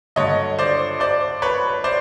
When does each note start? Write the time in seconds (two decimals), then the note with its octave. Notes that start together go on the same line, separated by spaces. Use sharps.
0.16 G2 D3 F#3 C#5 D#5
0.59 C5 D5
1.00 C5 D5
1.42 B4 C#5
1.84 C5 D5